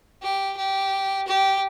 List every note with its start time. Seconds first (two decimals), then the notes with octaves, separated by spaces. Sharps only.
0.23 G4
0.57 G4
1.27 G4